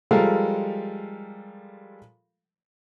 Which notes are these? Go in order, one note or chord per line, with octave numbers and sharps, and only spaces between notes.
F3 G3 G#3 A4 A#4 F5